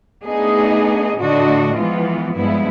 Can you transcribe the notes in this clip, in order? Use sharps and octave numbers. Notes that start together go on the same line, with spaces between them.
A3 B3 D4 D#4 G#4 D#5
A2 D3 D4 F#4 D#5
E3 F3 G#3 B3 F4
G2 F3 G#3 B3 E4